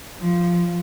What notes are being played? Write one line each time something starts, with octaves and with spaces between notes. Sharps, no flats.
F3